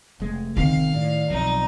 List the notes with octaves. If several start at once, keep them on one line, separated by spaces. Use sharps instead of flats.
F1 G#3 A3
D#3 C4 F5
A2 D5
B1 F2 D#4